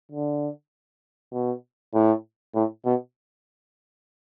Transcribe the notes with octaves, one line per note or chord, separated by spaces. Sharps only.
D3
B2
A2
A2
B2